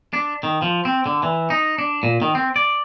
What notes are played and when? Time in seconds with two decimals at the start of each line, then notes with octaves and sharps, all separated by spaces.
0.13 D4
0.43 D#3
0.62 F3
0.85 C4
1.06 D3
1.23 E3
1.50 D#4
1.78 D4
2.03 A#2
2.22 D#3
2.35 C4
2.56 D5